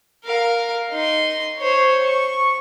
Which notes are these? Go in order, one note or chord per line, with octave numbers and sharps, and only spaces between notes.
A#4 F5
D#4 C6
C5 C#5
C#6